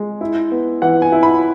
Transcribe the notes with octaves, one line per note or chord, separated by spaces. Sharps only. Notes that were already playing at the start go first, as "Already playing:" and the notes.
Already playing: G#3
E4
B3
E3 F#5
G#5
E4
B5